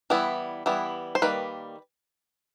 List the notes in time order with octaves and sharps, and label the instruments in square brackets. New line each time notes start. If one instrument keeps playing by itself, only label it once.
[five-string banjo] E3 G3 B3 E4
E3 G3 B3 E4
C5
D#3 G3 A#3 B4